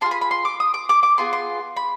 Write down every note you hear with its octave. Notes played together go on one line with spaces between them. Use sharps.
D4 F4 G#4 C6
B5
B5
C6
D6
D#6
D6
D6
D6
B3 F4 G#4 C6
C6
B5